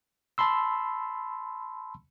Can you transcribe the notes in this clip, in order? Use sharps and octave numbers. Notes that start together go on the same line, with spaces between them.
A5 B5 C6 E6